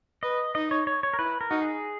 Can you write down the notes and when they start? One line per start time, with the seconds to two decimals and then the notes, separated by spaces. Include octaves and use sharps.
0.23 B4 D#5
0.55 D#4 D#5
0.71 C#5
0.87 C#5
1.03 C#5
1.14 A#4
1.19 E4 B4
1.41 A#4
1.50 D#4 F#4
1.62 G#4